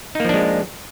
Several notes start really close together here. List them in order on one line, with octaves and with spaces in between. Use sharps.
D#4 A#3 F3 D4 G#3